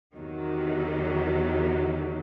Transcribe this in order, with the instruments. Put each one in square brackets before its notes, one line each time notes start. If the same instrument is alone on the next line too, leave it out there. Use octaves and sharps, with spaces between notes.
[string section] E2 C3 D#3 F#3